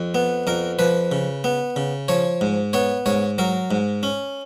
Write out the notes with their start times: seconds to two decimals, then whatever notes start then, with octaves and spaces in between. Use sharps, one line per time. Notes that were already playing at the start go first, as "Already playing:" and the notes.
Already playing: F2 F3
0.15 B3
0.47 F2 A#4
0.79 F3 B4
1.12 C#3
1.44 B3
1.76 C#3
2.08 F3 C#5
2.41 G#2
2.73 B3 C#5
3.06 G#2 C#5
3.38 F#3 A#4
3.71 G#2
4.03 C#4